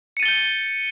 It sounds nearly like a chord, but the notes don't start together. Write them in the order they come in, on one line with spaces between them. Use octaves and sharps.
C#7 D#7 A6 G7 G6